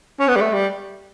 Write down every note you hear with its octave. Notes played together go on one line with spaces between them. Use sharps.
C#4
B3
G3
A3
G3